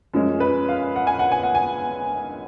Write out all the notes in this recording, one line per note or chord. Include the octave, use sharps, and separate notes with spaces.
F#2 F3 G#3 C#4
B4
F5
F#5
G#5
F#5
G#5
F#5
G#5